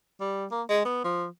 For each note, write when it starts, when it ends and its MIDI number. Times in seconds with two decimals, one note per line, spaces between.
0.21 0.46 55
0.51 0.63 58
0.69 0.83 56
0.85 1.00 59
1.04 1.26 53